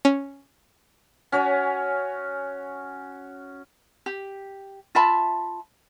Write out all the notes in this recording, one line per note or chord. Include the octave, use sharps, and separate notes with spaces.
C#4
C#4 F#4 C#5 G#5
G4
F4 E5 A5 B5